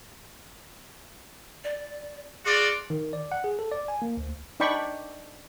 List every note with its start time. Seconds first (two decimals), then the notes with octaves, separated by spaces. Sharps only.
1.64 D5
2.45 F4 F#4 G#4 D5
2.90 D#3
3.13 D5
3.32 F#5
3.44 G#4
3.59 A4
3.72 D5
3.88 G#5
4.02 A#3
4.17 D2
4.60 D4 D#4 D5 G5 B5 C#6